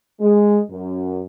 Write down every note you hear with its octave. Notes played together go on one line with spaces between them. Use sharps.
G#3
F#2